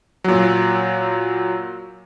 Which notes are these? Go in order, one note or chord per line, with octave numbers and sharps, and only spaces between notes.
A#2 F#3